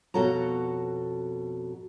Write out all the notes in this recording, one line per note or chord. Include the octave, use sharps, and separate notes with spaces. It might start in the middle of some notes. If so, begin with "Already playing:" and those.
F2 B2 F#4 A4 C#5 A#5